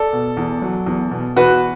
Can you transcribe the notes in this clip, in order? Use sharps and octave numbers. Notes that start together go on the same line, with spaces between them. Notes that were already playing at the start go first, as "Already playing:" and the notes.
Already playing: A4 D5
B2
E2
F#3
E2
B2
E2 F#4 B4